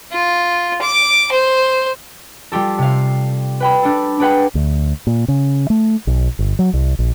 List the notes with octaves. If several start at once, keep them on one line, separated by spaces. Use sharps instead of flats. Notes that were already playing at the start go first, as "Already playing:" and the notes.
F4
D6
C5
G3 F4 G4 A4
C3 F5
B4 G5 B5
D4 A4
D4 G#4 B4 F#5 G5 B5
D2
A#2
C#3
A3
B1
G1
F#3
C2
A#1